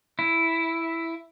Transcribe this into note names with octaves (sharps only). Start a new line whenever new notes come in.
E4